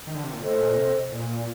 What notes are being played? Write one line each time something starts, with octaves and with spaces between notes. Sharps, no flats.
D#3
D3
C3
A#2
A2 A4 C5 D#5
A#2
C3
A#2